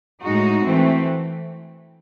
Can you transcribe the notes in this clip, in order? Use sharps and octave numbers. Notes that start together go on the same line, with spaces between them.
A2 G#3 D#4 F#4
E3 A3 C4